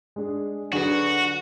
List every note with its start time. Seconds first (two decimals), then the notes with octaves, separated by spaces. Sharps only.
0.16 G#3 D4 G#4
0.72 D3 F#3 D4 F#4 G#4 B4